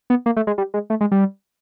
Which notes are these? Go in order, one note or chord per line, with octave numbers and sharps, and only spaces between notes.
B3
A#3
A3
G#3
G3
G#3
A3
G#3
G3